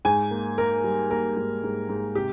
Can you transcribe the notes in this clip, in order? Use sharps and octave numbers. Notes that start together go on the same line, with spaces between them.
G#2 G#5
A#3
A#3 A#4
G3
A#3 A#4
G#2
G#2
G#2
C3 G4